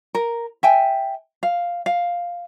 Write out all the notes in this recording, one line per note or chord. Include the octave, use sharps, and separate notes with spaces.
A#4
E5 G5 G#5
F5
F5